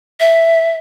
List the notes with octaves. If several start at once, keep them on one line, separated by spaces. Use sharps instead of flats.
E5